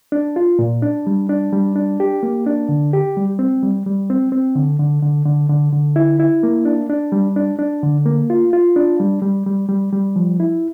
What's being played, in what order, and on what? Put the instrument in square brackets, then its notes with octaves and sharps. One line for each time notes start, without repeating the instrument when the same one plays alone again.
[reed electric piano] D4
F4
A#2
D4
G3
D4
G3
D4
G4
A#3
D4
D3
G4
G3
C4
G3
G3
C4
C4
D3
D3
D3
D3
D3
D3
E4
E4
A#3
D4
D4
G3
D4
D4
D3
A#3
F4
F4
D4
G3
G3
G3
G3
G3
F3
E4